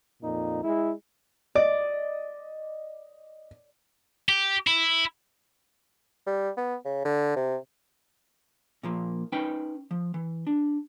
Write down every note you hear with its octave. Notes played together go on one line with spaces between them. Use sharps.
F2 A#2 D#4
G#3 E4
D5 D#5
G4
E4
G3
B3
C#3
D3
C3
A#2 F3 A#3
C#4 D#4 B4 G5
F3
E3
D4